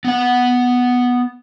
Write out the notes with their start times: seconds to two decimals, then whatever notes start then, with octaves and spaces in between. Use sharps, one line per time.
0.05 B3 F#5